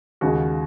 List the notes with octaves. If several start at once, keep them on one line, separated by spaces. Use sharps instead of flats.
D#2 C#3 G#3 F#4